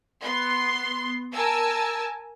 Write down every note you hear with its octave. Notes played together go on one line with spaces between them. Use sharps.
B3 C6
A#4 G#5 A5 E6